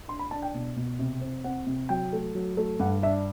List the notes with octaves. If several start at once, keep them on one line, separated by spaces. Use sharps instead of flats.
D4 C6
B5
D4 A5
G5
B2
B2
C3
C4
C4 F#5
C3
F#3 G5
A3
F#3
A3
G2 F#5
D4 E5